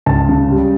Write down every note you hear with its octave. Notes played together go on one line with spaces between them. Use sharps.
C#2 A5
C#3
G3